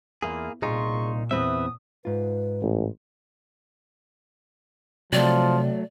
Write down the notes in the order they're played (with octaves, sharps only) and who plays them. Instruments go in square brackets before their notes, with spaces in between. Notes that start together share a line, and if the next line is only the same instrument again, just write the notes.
[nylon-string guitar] E2 [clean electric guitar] A#3 G#4 [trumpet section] E4 F4
[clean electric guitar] C2 D#4 F4 [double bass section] A#2 [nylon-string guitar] G#4 [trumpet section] C6 C#6
[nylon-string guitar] E2 C4 [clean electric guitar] B4 E5 [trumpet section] D#6
[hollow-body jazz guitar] G#2 F4 [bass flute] B4
[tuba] A1
[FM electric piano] C3 [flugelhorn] F3 [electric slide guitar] F#3 A3 [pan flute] D5